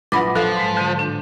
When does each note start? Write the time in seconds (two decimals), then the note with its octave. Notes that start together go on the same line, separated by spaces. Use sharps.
0.12 A#1 F#3 E4 B4 F#5 B5 D6 A#6
0.36 F3 A4 F5
0.57 G#2 G#3
0.77 D3 G6 D#7
0.97 A2 D4